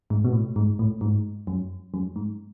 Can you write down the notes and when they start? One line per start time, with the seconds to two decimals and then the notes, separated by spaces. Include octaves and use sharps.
0.10 G#2
0.25 B2
0.33 A2
0.56 G#2
0.79 A2
1.01 G#2
1.47 F#2
1.94 F#2
2.16 G#2